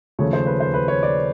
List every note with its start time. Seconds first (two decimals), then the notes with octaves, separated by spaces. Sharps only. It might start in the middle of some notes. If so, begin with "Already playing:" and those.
0.19 D#2 C#3 F3 A3 C#5
0.33 C5
0.46 B4
0.60 C5
0.74 B4
0.88 C#5
1.03 D5